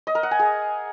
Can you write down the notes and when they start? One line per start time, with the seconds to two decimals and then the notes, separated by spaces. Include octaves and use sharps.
0.07 D#5
0.15 A#4
0.23 F#5
0.31 G#5
0.39 G#4